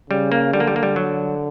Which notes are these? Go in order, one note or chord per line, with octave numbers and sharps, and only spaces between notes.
C#3 G3
A#3
D3 G3
A#3
G3
A#3
G3
F#3